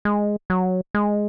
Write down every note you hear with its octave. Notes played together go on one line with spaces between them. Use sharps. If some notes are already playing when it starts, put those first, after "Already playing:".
G#3
F#3
G#3